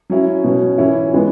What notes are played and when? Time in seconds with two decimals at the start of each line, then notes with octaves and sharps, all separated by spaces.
0.10 F#3 C#4 E4
0.44 B2 F#3 C#4
0.78 E3 C#4 E4
1.13 E3 G#3 B3